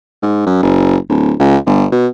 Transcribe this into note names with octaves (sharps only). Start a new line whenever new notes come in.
G#2
F#2
F#1
D1
C#2
G1
B2